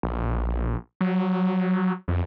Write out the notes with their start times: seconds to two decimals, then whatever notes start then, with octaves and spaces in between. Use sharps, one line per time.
0.03 A#1
1.01 F#3
2.08 F2